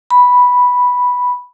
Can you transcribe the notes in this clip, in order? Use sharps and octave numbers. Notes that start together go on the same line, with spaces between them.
B5